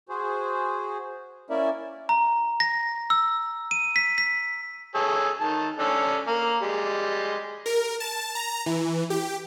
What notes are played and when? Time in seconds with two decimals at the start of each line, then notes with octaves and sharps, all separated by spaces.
0.09 F#4 G#4 C5
1.50 A#3 C#4 E4 A#4 D5 E5
2.09 A#5
2.60 A#6
3.10 E6
3.71 D#7
3.96 B6
4.18 B6
4.95 G#4 A4 C#5
5.41 D#3 A5
5.79 C#4 D4 A4
6.27 A#3
6.62 G3 G#3
7.66 A#4
8.00 A5
8.35 A#5
8.66 E3
9.10 G4